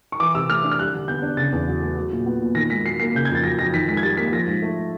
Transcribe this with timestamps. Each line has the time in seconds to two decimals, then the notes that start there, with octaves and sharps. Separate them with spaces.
0.12 C#6
0.20 E3 D6
0.34 C3 E6
0.49 A3 F6
0.63 D4
0.71 F6
0.79 G3 F#6
0.94 D3
1.08 B3 G6
1.22 D4
1.37 C#3 A6
1.52 E2
1.67 F#3
1.82 A3
1.96 F#3
2.12 A#2
2.26 B3
2.41 A#2
2.55 D#3 A#6
2.70 G#2 B6
2.85 F#3 C7
3.00 A#3 C7
3.14 C#3 G6
3.25 G#6
3.30 F2
3.35 A6
3.44 F#3 A#6
3.59 F2 A#6
3.73 D#3 B6
3.88 G#2 B6
3.97 G#6
4.03 G3 A6
4.17 A#3 B6
4.32 F3 A#6
4.47 G#2
4.62 A3